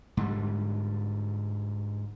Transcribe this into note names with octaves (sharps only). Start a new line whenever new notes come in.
G#2 D3 G3